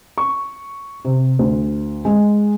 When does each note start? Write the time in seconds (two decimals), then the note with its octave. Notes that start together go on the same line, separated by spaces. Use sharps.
0.18 C#6
1.05 C3
1.39 D2
2.05 G#3